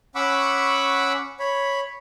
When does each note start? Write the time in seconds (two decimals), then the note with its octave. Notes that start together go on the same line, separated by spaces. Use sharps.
0.15 C#4 F#5 B5 C#6 D6 E6
1.40 C#5 B5